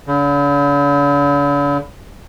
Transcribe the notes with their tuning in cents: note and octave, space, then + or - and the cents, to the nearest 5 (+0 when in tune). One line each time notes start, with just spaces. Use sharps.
D3 -45